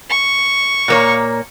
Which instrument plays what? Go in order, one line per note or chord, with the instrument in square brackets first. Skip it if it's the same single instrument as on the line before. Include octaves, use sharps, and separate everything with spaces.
[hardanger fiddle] C#6
[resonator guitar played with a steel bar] A#2 A#3 C#5